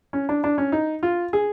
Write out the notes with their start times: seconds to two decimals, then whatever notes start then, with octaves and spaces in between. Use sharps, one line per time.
0.13 C#4
0.29 D4
0.44 D4
0.58 C#4
0.72 D#4
1.03 F4
1.33 G#4